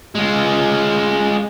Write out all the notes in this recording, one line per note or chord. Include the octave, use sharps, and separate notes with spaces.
G#3 F4